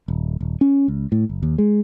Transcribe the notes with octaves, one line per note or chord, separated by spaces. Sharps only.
D#1
D#1
C#4
C#2
A2
F#1
D#2
G#3